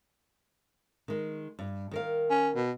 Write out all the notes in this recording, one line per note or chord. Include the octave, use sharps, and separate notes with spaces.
D#3 G#3
G2
D#3 A#4 F5
C#4
B2